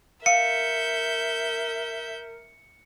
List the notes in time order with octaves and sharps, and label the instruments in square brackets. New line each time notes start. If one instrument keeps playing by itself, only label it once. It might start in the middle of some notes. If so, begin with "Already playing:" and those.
[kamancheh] A#4 [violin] E5 G6 [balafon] F5 [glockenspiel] C#7